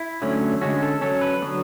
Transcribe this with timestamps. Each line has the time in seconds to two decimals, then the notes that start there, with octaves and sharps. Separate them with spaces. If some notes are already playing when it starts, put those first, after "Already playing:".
Already playing: E4
0.22 D3 F#3 A3 C#4
0.61 D3 G#3 C#4 F#4
0.82 A4
1.01 F#3 C#4 A4
1.21 B4
1.42 D3 F#3 B3